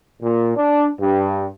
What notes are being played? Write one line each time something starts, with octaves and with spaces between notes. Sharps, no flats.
A#2
D4
G2